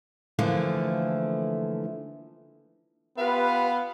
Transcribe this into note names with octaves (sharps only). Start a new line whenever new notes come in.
D3 E3 F3 A3 A#3 E4
B3 F4 G4 B4 F5